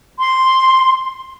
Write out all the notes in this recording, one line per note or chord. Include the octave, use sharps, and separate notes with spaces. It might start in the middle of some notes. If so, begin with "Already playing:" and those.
C6